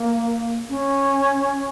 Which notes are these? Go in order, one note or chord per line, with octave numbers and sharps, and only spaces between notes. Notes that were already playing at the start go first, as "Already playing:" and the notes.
Already playing: A#3
C#4